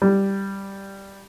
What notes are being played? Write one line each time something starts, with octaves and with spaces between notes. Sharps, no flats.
G3